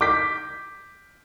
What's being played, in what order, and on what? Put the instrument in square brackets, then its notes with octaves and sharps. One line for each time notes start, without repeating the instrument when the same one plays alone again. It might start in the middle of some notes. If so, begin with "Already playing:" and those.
[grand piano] D6 G6 B6